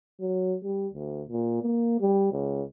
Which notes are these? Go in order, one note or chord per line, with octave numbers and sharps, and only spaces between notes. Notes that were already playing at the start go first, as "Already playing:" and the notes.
F#3
G3
D2
A#2
A#3
G3
C#2